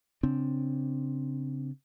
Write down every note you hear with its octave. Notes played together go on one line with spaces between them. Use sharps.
C#3 C4 D4